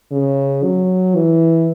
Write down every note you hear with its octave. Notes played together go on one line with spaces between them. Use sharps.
C#3
F#3
E3